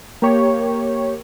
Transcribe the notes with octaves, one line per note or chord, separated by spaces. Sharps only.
A#3 G4 C#5